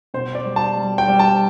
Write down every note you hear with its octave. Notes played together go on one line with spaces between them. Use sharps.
B2 C5
D5
G3
A5
G3
G5
G3
A5